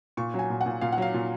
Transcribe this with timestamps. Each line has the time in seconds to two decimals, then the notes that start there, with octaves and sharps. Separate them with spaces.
0.17 A#2 C#6
0.34 F#3
0.39 G#5
0.50 A#2
0.61 F#5
0.66 A#2
0.81 A#2 F5
0.92 F#5
0.98 F#3 F5
1.14 A#2